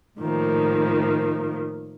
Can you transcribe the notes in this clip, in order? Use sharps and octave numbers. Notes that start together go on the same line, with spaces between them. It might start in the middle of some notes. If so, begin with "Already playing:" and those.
A2 D#3 F3 A#3